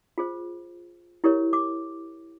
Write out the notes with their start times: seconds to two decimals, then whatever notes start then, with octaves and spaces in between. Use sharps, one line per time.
0.18 F4 G#4 C5
1.24 E4 G4 A#4 C#5
1.53 D6